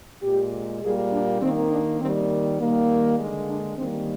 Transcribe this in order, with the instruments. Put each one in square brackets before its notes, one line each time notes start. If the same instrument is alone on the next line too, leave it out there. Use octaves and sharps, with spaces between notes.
[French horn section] A#2 G#3 G4
A#2 G3 A#3 G#4
D4
D#3 A#3 C4
D4
D#3 G3 A#3 C4
D#3 G3 A#3
D3 G#3
D4
D#3 G3 A#3 C4